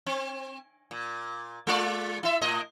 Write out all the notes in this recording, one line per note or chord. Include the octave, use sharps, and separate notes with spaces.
C4
A#2
G#3 F4 D5
E4 E5
A2 D#5